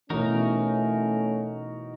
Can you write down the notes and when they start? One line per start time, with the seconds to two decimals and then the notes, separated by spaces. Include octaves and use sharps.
0.10 B2 E3 A3 C#4 D#4 F#4 A#4